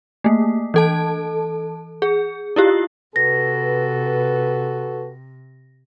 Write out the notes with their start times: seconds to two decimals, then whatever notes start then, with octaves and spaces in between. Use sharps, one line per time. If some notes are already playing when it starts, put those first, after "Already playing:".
0.24 A3 A#3
0.74 E3 A4 A5
2.02 G#4
2.56 E4 F4 G4
3.16 C3 F#4 A4 B4 A#6